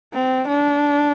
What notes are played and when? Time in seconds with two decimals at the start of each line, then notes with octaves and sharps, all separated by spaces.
0.14 C4
0.48 D4